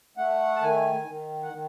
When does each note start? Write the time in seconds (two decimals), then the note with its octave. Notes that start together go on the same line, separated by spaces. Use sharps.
0.17 A3 F#5
0.56 A5
0.62 D#3 G#5
1.08 D#3
1.43 F#5
1.53 D#3